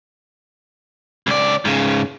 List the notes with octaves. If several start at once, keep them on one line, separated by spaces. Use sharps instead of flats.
C#2 D5
G#2 C#3